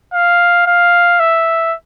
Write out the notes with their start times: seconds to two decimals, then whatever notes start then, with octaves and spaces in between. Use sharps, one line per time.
0.14 F5
0.67 F5
1.20 E5